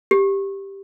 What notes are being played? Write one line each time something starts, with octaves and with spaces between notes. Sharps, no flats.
G4